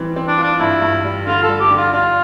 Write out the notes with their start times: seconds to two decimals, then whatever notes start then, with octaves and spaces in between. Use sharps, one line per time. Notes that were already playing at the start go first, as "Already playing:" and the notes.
Already playing: E3 G3 C4
0.16 C4
0.27 D4
0.38 F4
0.43 D4
0.60 G2 E4
0.82 G2
1.04 G3
1.27 D3 F4
1.43 A4
1.49 G3
1.60 G4
1.71 D3
1.77 F4
1.93 D4 F4